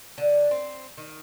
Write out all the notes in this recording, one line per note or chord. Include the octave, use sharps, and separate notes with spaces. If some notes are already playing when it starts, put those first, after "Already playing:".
D3
C4
D#3